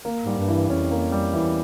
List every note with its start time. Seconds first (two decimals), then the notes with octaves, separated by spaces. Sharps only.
0.05 A#3
0.25 G#2 G3
0.38 G2
0.48 E3
0.69 F2 C#4
0.91 A#3
1.12 G3
1.33 E2 E3